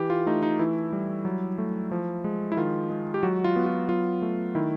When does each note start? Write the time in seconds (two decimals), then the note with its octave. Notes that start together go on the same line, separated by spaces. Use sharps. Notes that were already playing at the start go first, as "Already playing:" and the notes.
Already playing: E3 G4
0.10 F4
0.27 A3 D#4
0.43 D#4
0.59 E3 E4
0.93 G3
1.25 F#3
1.58 A3
1.91 F3
2.24 G#3
2.52 E4
2.57 D#3 F4
2.90 G#3
3.14 G4
3.23 F#3 F#4
3.44 F4
3.56 B3
3.66 F4
3.89 F#3 F4
4.22 A3
4.55 D#3 E4